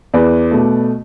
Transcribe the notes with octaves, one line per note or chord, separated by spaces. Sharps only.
E2 B4 D5
B2 A3